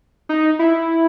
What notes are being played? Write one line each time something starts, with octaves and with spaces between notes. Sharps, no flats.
D#4
E4